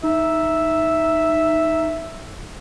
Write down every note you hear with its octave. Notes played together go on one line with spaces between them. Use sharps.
D#4 E5